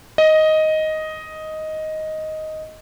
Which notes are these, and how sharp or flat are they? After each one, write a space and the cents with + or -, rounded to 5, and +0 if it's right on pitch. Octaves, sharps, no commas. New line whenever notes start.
D#5 +5